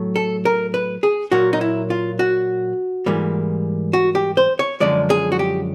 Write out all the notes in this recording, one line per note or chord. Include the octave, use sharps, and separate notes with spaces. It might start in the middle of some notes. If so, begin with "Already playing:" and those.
Already playing: A2 F#3 A3
A4
A#4
B4
G#4
A#2 F#3 A#3 F#4
D#4
E4
F4
F#4
G#2 E3 G3 A#3
F#4
G4
C5
C#5
F#2 D3 F3 G#3 D5
G#4
F#4
G4